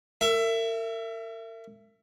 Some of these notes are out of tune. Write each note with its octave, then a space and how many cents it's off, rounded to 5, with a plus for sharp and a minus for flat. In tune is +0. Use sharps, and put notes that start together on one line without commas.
A#4 -40 E5 +20